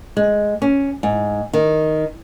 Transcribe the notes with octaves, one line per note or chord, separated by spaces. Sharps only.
G#3
C#4
G#2
D#3